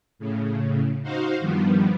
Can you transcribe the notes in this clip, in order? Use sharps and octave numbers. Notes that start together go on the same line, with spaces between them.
A2 C#3
D#4 F#4 C5 F5
G2 D#3 F3 G3 B3